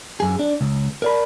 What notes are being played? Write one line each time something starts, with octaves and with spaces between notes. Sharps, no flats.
F#2 G#4
D4
C#2
A#4 D5 B5